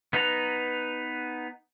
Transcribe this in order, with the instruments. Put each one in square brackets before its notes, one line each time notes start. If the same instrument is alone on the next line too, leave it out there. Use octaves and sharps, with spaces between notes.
[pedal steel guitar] B3 D#4 B4 F#5 A#5